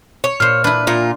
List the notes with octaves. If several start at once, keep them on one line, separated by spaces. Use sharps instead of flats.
C#5
A#2 C5 F6
D4 E4 B4
A#2 F4